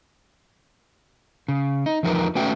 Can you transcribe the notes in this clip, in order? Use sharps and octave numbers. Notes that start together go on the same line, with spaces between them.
C#3
D#4
E2 F3 D#4 A#4 B4 A#5
A3 C#4 F#4 B4 E5 G5